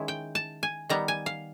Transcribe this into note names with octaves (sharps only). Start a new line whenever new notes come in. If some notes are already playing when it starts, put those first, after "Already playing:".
Already playing: D#3 G#3 C#4 E4
G5
A5
G#5
D#3 G3 B3 A#5
G#5
F5